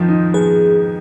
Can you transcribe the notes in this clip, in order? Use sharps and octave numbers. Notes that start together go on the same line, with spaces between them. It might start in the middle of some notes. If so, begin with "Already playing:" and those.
Already playing: F2 D#3 F3
D#4
B3 G#4